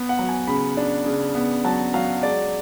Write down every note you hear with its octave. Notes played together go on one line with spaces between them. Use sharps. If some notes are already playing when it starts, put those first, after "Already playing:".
Already playing: B3
F#5
F#3
G#5
C#3 B5
D4
C#3
B3
F#3 A5
F#3 F5
G#3 D5